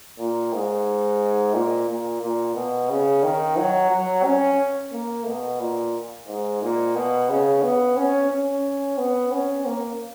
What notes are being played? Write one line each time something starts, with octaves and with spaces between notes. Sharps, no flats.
A#2
G#2
A#2
A#2
A#2
B2
C#3
D#3
F#3
F#3
C#4
A#3
B2
A#2
G#2
A#2
B2
C#3
B3
C#4
C#4
B3
C#4
A#3